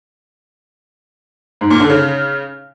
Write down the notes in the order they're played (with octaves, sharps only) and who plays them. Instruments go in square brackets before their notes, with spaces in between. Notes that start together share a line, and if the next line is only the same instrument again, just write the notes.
[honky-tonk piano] G#2
A#2
D3
C#3